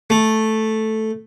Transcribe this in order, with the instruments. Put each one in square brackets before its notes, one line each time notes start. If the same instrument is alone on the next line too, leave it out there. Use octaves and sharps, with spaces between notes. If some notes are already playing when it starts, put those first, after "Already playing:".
[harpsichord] A3